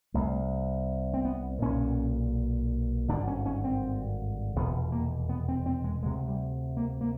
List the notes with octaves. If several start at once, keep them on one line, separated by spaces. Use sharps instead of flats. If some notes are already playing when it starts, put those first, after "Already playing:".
C2 C3 A3
C4
B3
B1 A#2 C#4
G#1 G2 D3 D4
C#4
C#4
C4
F1 E2 B2 B3
A#3
B3
C4
C4
G#3
D2 C3 G#3
G3
A#3
A#3